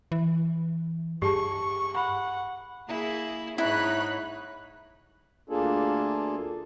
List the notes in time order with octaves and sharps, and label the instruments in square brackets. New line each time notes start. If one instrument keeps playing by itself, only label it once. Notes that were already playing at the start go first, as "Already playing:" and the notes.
[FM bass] E3
[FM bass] G2 [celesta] G4 G#4 A5 [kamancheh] C#6
[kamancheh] F#5 [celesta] B5
[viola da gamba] A#3 E4 G#4
[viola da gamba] G#2 D#4 [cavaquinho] E4 [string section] C#5 B5 F#6
[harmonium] D2 A#3 D4 F4 G#4 A4